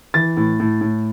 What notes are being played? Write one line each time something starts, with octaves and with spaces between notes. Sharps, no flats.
E3 A6
A2
A2
A2